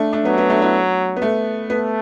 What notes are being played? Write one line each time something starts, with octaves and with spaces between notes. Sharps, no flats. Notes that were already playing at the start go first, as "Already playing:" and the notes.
Already playing: A3 D4
A3 D4
F#3 B3
B3
A3 D4
B3 E4
B3
A3
A3 B3